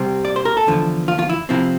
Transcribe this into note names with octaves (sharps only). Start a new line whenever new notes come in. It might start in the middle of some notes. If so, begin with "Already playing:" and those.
Already playing: C2 C3 G3 C4
D5
C5
A#4
A4
E2 D3 F3
F4
F4
E4
C3 F3 C4 E4